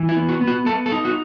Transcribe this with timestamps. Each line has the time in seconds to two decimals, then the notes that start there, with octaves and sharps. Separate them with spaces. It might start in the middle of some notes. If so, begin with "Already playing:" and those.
Already playing: E3
0.09 E4
0.16 B3
0.29 F#4
0.41 B3
0.47 F#4
0.66 B3 A4
0.86 A4
0.92 D#4
1.05 F#4